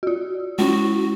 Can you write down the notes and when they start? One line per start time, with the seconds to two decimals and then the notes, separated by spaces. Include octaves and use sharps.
0.03 F4 F#4
0.59 G#3 C#4 E4 F#4